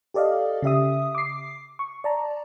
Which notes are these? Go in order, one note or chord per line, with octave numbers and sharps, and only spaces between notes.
G4 A4 D5 D#5 F5
C#3 G4 E5 D#6
D6 C7
C#6
D5 A5 A#5